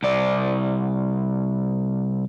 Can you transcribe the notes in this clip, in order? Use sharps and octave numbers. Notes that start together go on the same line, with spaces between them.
C2 D5